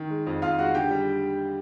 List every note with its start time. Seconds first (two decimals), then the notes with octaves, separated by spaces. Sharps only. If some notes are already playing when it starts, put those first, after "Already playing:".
Already playing: D#3
0.10 G#3
0.27 F2
0.42 F2 F4 F5
0.58 G#3 F#4 F#5
0.74 D3 G4 G5
0.91 G3